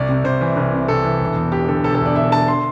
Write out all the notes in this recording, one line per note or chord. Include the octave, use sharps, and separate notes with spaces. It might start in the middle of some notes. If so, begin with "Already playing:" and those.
Already playing: C2 D5
C3
C2 C5
E3
C2
C3
C2 A4
E3
E1
E2
E1 G4
D3 A4
E1 A4
A4
E2
D5
E1 E5
D3 A5
C6